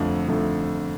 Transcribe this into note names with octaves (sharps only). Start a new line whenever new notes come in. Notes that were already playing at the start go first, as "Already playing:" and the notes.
Already playing: F2 D3 A3
F2 D3 A3